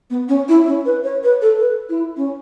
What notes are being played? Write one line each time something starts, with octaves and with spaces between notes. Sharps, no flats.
B3
C#4
E4
C#4
B4
C#5
B4
A4
B4
E4
C#4